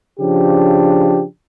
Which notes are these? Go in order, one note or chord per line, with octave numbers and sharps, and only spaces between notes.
C#3 F3 D4 G4